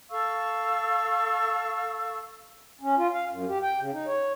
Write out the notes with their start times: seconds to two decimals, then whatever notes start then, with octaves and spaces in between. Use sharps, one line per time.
0.10 A4 F5 C#6 E6
2.81 C#4
2.98 F4
3.13 F5
3.30 F#2
3.47 G4
3.62 G5
3.79 C#3
3.93 D#4
4.07 C#5